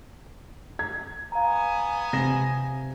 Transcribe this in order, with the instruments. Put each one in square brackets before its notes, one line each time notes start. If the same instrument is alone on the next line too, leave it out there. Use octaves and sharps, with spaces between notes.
[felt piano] G#6
[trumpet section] B3 G#5 [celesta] F5 A#5
[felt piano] C3 A#6 E7